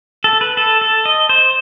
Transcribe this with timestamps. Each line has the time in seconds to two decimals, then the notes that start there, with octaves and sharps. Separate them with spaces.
0.24 A4
0.41 B4
0.57 A4
0.81 A4
1.06 D#5
1.29 C5